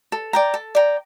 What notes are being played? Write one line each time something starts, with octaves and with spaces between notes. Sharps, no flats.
A4
D5 G5 A#5
A4
D5 G5 A#5